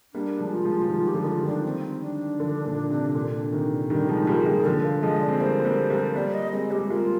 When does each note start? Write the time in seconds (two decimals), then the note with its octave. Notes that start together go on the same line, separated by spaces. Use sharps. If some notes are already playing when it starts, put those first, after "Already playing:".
0.14 G3 A#3 D4
0.39 F3 G#3
0.52 F4
0.64 F3 G#3
0.81 F3
0.90 D#3 G3 F4
1.08 G4
1.14 D3 F3
1.22 D#4
1.27 F4
1.40 D#3 G3
1.46 D4
1.64 C4
2.02 D4
2.40 D3 F3
2.65 A#2 D3
2.90 C3
3.15 A#2 D3
3.52 C3 D#3
3.90 D#3 G3 D4
4.09 F3 G#3 D#4
4.23 D#4
4.27 G3 A#3 F4
4.38 G#3
4.46 D#3 G3 G#4
4.65 D3 F3 A#4
4.84 F5
5.02 F3 G#3 D#5
5.21 D5
5.29 C4
5.40 G3 A#3 C5
5.60 C4
5.65 G3 A#3
5.90 G3 A#3
6.15 G3 A#3 D5
6.34 D#5
6.52 G#3 C4 D#5
6.70 G3 G4
6.80 G#3
6.90 G3 A#3 F4